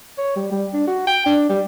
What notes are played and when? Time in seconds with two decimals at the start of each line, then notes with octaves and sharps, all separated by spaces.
0.18 C#5
0.36 G3
0.52 G3
0.73 D4
0.87 F#4
1.07 G5
1.26 D4
1.49 G3